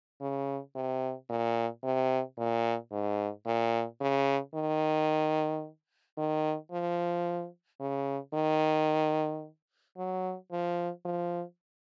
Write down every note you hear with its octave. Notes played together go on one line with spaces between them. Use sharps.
C#3
C3
A#2
C3
A#2
G#2
A#2
C#3
D#3
D#3
F3
C#3
D#3
F#3
F3
F3